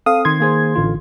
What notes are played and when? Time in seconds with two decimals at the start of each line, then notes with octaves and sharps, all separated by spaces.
0.06 C4 A4 F5 D#6
0.25 D#3 C6 G#6
0.40 A#3 G#4 C5
0.75 A1 D3 F4